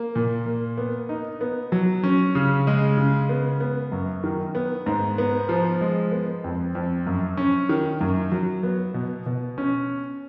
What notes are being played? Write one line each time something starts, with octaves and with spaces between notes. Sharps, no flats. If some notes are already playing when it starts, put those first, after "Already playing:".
Already playing: A#3
A#2
A#3
B3
D#4
B3
F#3
C#4
C#3
G#3
C#3
B3
B3
F#2
D#3
B3
G#2
B3
F3
G#3
B3
F2
F2
F#2
C#4
D#3
F#2
F#3
B3
B2
B2
C#4